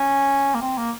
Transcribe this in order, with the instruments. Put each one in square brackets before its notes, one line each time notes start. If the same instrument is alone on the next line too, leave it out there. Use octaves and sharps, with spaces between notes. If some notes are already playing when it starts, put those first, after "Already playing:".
Already playing: [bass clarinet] C#4
A#3
C4
A#3